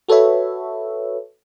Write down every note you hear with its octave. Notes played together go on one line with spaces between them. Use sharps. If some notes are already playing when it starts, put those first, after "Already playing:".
F#4 A4 B4 C#5 E5